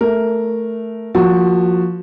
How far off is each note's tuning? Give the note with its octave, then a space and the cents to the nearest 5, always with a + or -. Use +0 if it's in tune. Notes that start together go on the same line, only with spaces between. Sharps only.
A3 +0 A#4 +0
F3 +10 A#3 +0 F#4 +0